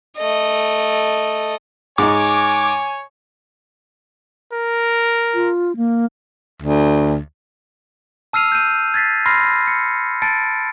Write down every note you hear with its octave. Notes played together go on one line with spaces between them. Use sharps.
A3 D#5
G#2 D#4 C#5 G#5 D6
A#4
F4
A#3
D2
A5 E6 F6 C7 D#7 F7
G6 D#7
G#6 A6 B6 C7
B5 C6 F6 A#6 C7
C#7
A5 A6 C#7 D7